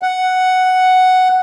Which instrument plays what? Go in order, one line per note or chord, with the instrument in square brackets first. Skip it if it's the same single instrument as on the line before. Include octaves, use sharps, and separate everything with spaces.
[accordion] F#5